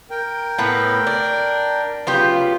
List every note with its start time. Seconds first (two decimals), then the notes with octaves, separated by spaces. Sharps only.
0.10 A#4 G5
0.58 A2 B3 B4
1.07 D4
2.07 C#3 F#3 B3 F4 G4